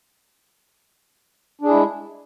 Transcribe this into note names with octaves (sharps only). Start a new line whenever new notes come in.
G#3 D4 E4 G#4